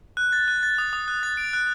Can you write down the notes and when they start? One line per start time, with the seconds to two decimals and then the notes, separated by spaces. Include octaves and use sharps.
0.17 F#6
0.33 A6
0.48 F#6
0.63 A6
0.78 D#6
0.93 D#6
1.08 F#6
1.23 A6
1.37 D7
1.53 F#6